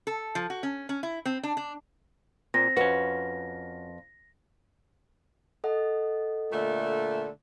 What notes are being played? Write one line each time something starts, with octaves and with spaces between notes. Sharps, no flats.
A4
F3
F#4
C#4
C#4
E4
C4
D4
D4
A#2 C4 A#6
F2 C#4 F#4 B4
A4 D#5 F#5
A#2 D3 A3